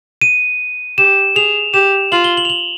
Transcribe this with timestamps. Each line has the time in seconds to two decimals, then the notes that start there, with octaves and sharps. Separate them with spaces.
0.22 D#7
0.98 G4 E7
1.36 G#4 F7
1.74 G4 E7
2.12 F4 F#7
2.24 G7
2.37 F#7
2.45 F7
2.50 F#7